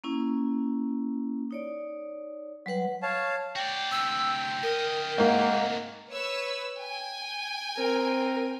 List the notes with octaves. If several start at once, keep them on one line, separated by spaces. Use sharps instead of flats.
A#3 C#4 E4
D#4 C#5 D5
F#3 G3 B4 F#5
C#5 F5 A5
F#4 D5 G5
D2 C3 E6
D2 A#4 D#5
G#2 A3 A#3 C4
B4 C#5 E6
G5 G#5
C4 A#4